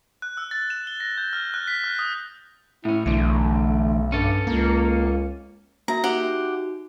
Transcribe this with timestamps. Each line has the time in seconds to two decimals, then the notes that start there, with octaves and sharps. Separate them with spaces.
0.22 F#6
0.37 E6
0.51 A6
0.70 E7
0.87 G7
1.00 A#6
1.18 G6
1.33 F6
1.54 F#6
1.68 B6
1.84 F6
1.99 D#6
2.85 A2 C#4 E4
3.06 B1 E2 D3 A3
4.12 G2 C#4 A4
4.47 C#2 A#3
5.88 A#3 F#4 E5 A#5
6.04 D#4 F#4 G4 F#5